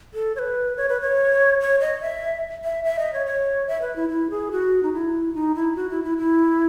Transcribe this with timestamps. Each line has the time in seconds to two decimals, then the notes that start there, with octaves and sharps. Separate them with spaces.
0.14 A4
0.36 C#5
0.39 B4
0.77 C#5
0.89 B4
1.01 C#5
1.61 C#5
1.80 D#5
2.01 E5
2.64 E5
2.84 E5
2.99 D#5
3.13 C#5
3.26 C#5
3.68 E5
3.82 B4
3.96 E4
4.09 E4
4.30 G#4
4.52 F#4
4.83 D#4
4.93 E4
5.34 D#4
5.55 E4
5.76 F#4
5.90 E4
6.04 E4
6.18 E4